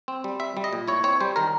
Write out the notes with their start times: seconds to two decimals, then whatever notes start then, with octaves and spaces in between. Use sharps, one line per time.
0.08 C4
0.24 G3
0.39 C4 E5
0.57 G3
0.64 D#5
0.73 A#2
0.88 E4 C#5
1.04 C4 C#5
1.20 G3 C5
1.36 D#3 A#4